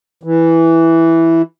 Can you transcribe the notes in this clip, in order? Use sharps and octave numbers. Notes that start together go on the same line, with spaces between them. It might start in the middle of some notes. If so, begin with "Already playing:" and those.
E3